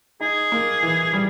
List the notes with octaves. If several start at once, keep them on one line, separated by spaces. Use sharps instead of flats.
D#4 G#4
A#3
E3
G3